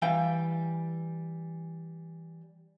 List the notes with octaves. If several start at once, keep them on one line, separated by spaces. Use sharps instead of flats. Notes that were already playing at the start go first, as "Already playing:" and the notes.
E3 G3 F5 G5